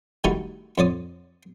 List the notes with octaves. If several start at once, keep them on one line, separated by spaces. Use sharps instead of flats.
D#3 G3 A3 D#4 E4 F#4
F2 C#5 D5 D#6